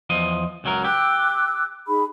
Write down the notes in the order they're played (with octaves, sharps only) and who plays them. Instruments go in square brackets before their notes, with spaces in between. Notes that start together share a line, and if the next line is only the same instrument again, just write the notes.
[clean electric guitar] E2 F3 D#5
C#2 F#3 A#4
[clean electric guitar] G4 [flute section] D6 E6 F#6
[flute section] D#4 G#4 B5